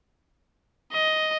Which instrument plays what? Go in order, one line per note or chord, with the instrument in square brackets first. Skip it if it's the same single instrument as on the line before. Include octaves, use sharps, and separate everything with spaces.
[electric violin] D#5